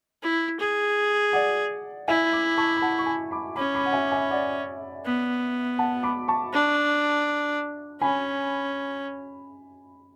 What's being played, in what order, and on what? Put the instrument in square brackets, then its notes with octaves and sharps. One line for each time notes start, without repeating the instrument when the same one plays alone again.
[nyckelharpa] E4
G#4
[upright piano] D5 F#5
[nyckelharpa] E4 [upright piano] E5 G#5
[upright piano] B5 D6
A5 C#6
B5
F#5 A5
C#6
G#5 B5
B5 D6
[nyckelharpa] C#4 [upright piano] B5 D6
[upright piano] B5 D6
F#5
E5 G#5
E5 G#5
D5 F#5
[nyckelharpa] B3
[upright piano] F#5 A5
B5 D6
A5 C#6
[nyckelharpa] D4
[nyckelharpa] C#4 [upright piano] G#5 B5